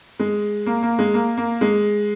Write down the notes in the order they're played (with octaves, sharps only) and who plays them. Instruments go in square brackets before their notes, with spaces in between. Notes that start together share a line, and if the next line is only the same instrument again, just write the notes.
[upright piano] G#3
A#3
A#3
G#3
A#3
A#3
G#3